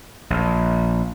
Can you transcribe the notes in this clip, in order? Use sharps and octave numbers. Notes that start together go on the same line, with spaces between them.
A#1